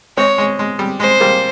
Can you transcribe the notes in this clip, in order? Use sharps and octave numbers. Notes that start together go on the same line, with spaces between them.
G#3 C4 C#5
G#3
G#3
G3
G#3 C5
G3 A#3